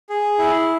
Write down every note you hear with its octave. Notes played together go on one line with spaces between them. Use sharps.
G#4
E4